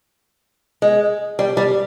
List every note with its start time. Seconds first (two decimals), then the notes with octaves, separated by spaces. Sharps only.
0.82 G#3
1.39 G3
1.57 G3